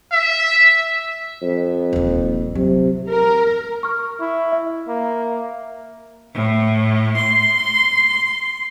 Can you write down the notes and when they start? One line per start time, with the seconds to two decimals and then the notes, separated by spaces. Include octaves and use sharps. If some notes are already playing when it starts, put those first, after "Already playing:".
0.13 E5
1.42 F2
1.93 D#1 D#2
2.55 C3 F#3
3.08 A#4
3.83 C#6 F6
4.20 E4
4.52 E5
4.88 A#3
6.34 A2
7.16 C6